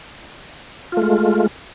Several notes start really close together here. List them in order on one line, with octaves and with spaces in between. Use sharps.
F4 A3 G#3